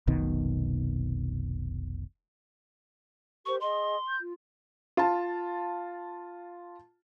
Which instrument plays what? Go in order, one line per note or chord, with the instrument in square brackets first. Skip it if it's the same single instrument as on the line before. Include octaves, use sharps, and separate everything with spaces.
[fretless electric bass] F1 B1 B2 D#3
[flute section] G4 A#4 C5 [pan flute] C#6
[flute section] G#4 D#5 [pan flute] C6
[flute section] G6
F4
[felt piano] F4 A5